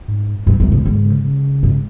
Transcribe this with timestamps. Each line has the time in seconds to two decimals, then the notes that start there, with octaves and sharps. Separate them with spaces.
0.08 G#2
0.46 G2 C3
0.60 F#2
0.67 C#3
0.72 G#2
0.85 G#2 D3
1.05 C#3
1.24 C#3
1.63 G#2